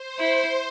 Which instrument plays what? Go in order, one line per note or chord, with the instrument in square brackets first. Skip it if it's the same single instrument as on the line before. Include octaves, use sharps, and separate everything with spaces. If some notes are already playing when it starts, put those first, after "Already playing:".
Already playing: [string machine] C5
[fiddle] E4